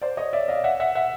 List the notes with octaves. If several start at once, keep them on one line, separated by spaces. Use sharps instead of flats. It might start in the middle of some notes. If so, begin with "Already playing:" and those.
C5 D5
C#5 D#5
D5 E5
D#5 F5
E5 F#5
E5 F#5
E5 F#5